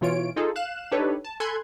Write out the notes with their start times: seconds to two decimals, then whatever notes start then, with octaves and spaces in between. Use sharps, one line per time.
0.01 B2 E3 F4 C#5 D7
0.36 D#4 F4 G#4 A4
0.56 F5 F#6 E7
0.92 D4 D#4 G4 A4 B4 C#5
1.25 A5
1.40 A4 G#5 B5 C6 F#6 G#6